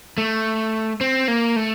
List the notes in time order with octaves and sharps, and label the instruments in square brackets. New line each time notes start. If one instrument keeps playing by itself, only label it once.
[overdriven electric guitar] A3
C4
A#3
A3